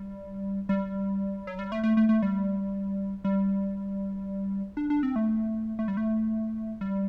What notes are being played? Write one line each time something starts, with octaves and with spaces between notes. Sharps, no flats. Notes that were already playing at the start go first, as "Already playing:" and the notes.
Already playing: G3
G3
F#3
G3
A3
A3
A3
A3
G3
G3
D4
D4
C4
A3
A3
G3
A3
G3